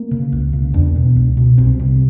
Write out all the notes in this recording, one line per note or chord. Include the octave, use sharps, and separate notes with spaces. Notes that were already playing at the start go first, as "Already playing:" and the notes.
Already playing: A#3
C#3
C#2
C#3
E2 D4
B2
C#2
B2
C2 C4
C3